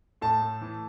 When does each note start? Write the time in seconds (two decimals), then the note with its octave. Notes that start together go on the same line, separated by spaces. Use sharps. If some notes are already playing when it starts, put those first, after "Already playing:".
0.21 A2 A5
0.42 A3
0.61 E3